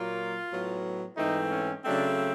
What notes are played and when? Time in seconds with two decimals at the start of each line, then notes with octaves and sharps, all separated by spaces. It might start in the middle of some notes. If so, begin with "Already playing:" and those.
Already playing: A#2 F#3 A#3 F4
0.51 A2 F#3 B3
1.17 G#2 E3 A3 C4 D#4
1.51 C#4
1.84 C#3 F#3 A3 C4 D4